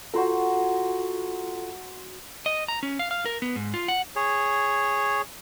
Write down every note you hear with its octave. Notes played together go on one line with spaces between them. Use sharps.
F4 F#4 A4 C5 A#5
D#5
A#5
C#4
F5
F5
A#4
B3
G#2
F4
F#5
G#4 C#5